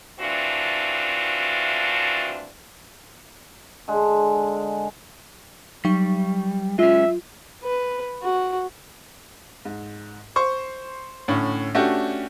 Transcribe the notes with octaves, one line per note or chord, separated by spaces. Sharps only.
E3 A3 C4 D4 F4 F#4
D3 G#3
F#3 G3 C#6
G#3 C#4 F4 E5
B4
F#4
G#2
C5 C#6
A2 D3 C#4
A3 C#4 D4 F#4 G4 A4